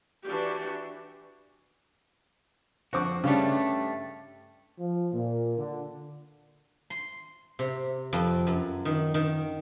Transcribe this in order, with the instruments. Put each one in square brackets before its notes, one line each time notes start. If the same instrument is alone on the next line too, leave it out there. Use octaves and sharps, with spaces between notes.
[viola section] E3 D4 F#4 G4
[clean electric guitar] F2 F#4 [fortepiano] D3 C5 D6
[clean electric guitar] G2 G3 A3 [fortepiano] C#3 D4
[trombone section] F3
A#2
D3
[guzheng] C6
C3
F2
F#2
D#3
D#3